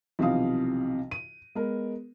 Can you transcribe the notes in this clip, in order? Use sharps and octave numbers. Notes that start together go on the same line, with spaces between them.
B1 C3 E3 F3 F5 D#6
D#7
G#3 B3 A#4